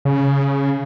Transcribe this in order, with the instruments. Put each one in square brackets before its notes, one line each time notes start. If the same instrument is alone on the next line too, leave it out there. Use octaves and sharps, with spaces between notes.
[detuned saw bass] C#3